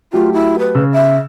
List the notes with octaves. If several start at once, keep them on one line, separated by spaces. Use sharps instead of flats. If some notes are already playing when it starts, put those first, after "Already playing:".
F#3 A3 F4 G4
E4
B4
C#3 E6
E5